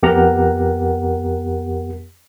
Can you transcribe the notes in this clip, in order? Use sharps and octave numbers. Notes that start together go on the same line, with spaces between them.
F2 B3 G4 A#4 F#5 A#5